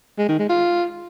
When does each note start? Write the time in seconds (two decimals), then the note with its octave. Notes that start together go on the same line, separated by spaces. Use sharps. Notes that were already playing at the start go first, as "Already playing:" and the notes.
0.18 G#3
0.29 D#3
0.39 G#3
0.49 F4